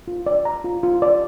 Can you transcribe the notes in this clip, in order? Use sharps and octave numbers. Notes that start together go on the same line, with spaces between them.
F4
D5
A#5
F4
F4
D5